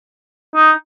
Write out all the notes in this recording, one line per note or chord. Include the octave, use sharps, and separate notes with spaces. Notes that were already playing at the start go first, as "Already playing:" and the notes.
D#4